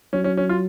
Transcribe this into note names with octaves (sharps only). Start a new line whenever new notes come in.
F#3 C#4
C#4
C#4
F4